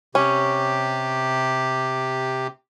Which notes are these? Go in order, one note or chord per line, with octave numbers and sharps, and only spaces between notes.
C3 C#4 G4